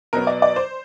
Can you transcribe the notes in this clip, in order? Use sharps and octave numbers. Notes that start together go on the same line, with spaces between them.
B2 F#3 B3 A#4
D5
D5
C5